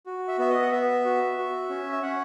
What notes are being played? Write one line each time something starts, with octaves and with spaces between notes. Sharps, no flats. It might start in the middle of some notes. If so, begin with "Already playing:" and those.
F#4
E5
B3 E5
D#5
F#5
B3 E5
F#4
F#4
C#4
E5
C#4 F#5